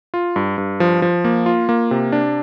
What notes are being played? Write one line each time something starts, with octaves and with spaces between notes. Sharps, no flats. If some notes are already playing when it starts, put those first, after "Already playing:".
F4
G2
G2
F3
F3
A#3
F4
A#3
C3
D4